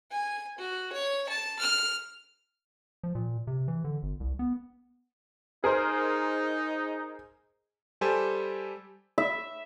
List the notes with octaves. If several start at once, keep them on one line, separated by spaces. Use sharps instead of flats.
G#5
F#4
C#5
A5
F6
F3
A#2
C3
E3
D3
G1
C2
B3
D#4 G#4 A#4 C5
G3 G4 A4 C5 G#5
E5